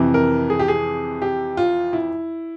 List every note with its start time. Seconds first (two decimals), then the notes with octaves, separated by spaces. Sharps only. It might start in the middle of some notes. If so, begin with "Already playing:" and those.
Already playing: F2 C3 E3
0.14 A#4
0.50 G#4
0.59 G4
0.68 G#4
1.22 G4
1.57 F4
1.93 E4